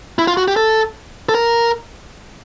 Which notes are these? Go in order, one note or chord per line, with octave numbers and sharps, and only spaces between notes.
E4
F4
F#4
G4
A4
A4
A#4